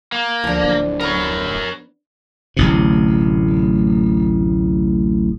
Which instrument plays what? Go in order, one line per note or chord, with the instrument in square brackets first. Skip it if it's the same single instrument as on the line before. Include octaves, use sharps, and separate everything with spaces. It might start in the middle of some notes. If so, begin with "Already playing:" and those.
[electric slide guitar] A#3
[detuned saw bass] D2 [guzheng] F3 D4
[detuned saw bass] D1
[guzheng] B3 [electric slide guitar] A#4 C#5
[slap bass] D1 A1 C3